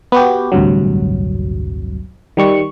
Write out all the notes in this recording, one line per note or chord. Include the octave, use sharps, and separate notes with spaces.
B3 F#4 G4
A1 D2 G2 C3 F#3
D#3 G3 C#6